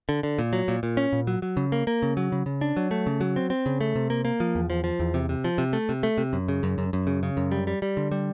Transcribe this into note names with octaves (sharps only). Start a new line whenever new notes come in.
D3
D3
A#2
F#3
A#2
A#2
C#4
A#2
F#3
F#3
C#3
A#3
A#3
C#3
F#3
C#3
C#3
D4
F#3
A3
C#3
F#3
C4
C4
C#3
A3
C3
A#3
A#3
F3
E2
F3
F3
E2
C3
C3
F3
C3
A3
C3
A3
C3
F#2
C#3
F#2
F#2
F#2
C#3
C#3
F#2
G3
G3
G3
D3
G3